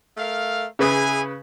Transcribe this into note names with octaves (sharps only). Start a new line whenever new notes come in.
A3 A#4 F5
C#3 E4 G#4 B4 G#5 D#6